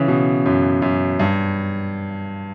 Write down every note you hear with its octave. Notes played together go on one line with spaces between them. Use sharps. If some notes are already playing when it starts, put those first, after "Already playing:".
Already playing: C#3 E3
B2
F#2
F#2
G2